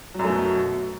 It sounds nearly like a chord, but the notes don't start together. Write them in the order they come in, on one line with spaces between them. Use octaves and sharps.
F#3 F#2 A3 B2